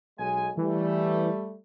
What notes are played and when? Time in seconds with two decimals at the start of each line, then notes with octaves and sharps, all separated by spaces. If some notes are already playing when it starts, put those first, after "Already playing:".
0.18 B1 G#3 G#5
0.57 E3 G3 A3